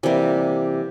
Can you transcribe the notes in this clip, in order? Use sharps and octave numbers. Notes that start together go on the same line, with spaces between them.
C3 E3 G3 A#3